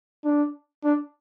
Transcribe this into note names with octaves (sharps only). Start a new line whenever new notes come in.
D4
D4